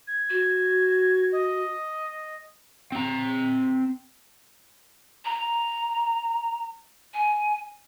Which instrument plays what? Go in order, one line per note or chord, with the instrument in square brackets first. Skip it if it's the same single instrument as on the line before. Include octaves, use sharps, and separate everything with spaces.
[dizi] G#6
[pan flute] F#4
[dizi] D#5
[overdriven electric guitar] C4 A#5
[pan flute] A#5
G#5